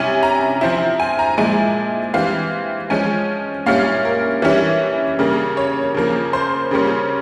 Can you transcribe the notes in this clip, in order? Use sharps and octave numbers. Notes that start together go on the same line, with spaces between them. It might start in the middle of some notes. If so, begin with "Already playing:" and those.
Already playing: C3 G3 C#4 E4 G#5
A#5
F3 C4 E4
G#5
A#5
A#2 F3 G#3 E4 G#5
E3 G3 C4 F5
F3 G#3 C#4 G#5
A#2 G3 C#4 E4 F5
A#4
E3 G3 C#4 E4
C#3 G3 A#3
C#5
C#3 F3 A#3
C5
C#3 G3 A#3 C#4